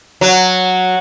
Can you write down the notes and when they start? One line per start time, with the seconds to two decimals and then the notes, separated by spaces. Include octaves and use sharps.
0.21 F#3